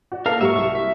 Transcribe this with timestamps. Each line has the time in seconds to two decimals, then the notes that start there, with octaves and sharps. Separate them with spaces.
0.12 F#4 D5
0.26 A#3 A4 A#4 F5
0.41 G#2 F#3 E5 C#6
0.56 C2
0.75 E5